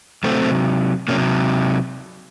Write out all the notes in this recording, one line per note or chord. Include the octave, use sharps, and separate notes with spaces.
C3 F#3 A3 C4
C3 F#3 A#3 C#4